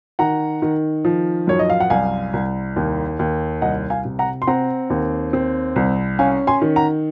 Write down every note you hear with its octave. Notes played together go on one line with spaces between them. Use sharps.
D#3 F#5 A#5
D#3
F3
F#2 C#5
D#5
F5
F#5
C2 F5 G#5
C2
D#2
D#2
C2 D#5 F#5
F5 G#5
C3
F#5 A#5
C6
C4 F#5 A#5
D#2
C4
C2
C#4 F5 G#5
G#5 C6
D#3
F#5 A#5